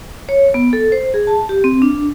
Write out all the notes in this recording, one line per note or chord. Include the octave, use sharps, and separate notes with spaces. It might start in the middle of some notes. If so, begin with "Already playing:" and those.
C#5
B3
A4
C5
G#4
A5
G4
C4
D4